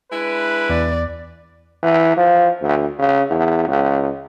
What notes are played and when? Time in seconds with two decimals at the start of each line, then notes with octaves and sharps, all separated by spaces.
0.13 G#3 D4 E4 B4
0.70 E2 D5
1.83 E3
2.17 F3
2.62 D2
2.99 C#3
3.30 E2
3.67 C#2